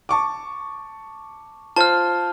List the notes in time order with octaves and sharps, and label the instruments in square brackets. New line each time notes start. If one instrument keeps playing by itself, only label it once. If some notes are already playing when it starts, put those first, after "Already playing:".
[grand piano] A5 C#6 D6
[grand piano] F4 C5 [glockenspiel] A5 F6